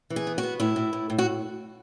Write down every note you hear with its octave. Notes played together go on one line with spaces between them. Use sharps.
E3
G#4
B3
F#4
B3
A2 E4
A2
A2
A2
F#4